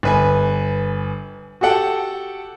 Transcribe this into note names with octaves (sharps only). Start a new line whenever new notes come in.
G1 B4 G#5
F#4 G4 A4 F#5 G5 A5